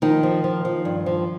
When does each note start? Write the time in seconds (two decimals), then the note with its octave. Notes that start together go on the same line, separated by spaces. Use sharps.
0.02 D#3 F3 D#4
0.23 F3
0.44 F3
0.65 F3
0.85 G2
1.06 F3